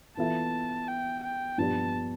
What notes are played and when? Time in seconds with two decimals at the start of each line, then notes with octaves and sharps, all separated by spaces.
0.17 E3 B3 F4 A4 E5 A5
0.88 G5
1.23 G5
1.58 G2 F3 B3 D4 G4 A5